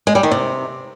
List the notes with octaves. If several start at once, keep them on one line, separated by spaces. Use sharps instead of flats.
G#3
G3
D#3
C3